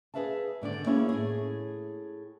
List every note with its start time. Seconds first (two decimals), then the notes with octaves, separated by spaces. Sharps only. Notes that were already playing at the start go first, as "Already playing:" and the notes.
0.14 G#4 A4 B4 E5 F5 A5
0.62 G#2 D3 D#3 D5
0.86 A#3 B3 C#4 E4 G#4 A#4
1.09 A2 G#4